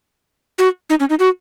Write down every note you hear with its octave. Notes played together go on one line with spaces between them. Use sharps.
F#4
D#4
C#4
D#4
F#4